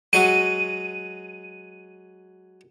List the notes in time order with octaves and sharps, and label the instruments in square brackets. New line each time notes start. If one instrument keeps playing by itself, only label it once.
[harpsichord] F#3 G#3 F#4 [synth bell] D#7